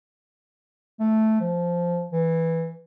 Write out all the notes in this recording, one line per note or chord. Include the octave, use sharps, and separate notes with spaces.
A3
F3
E3